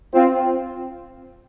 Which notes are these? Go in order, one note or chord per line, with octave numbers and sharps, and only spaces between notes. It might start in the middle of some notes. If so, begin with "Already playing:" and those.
C4 F4